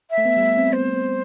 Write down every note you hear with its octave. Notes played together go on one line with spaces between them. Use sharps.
E5
A3
B3
G3
A3
C4
B3 C5
B3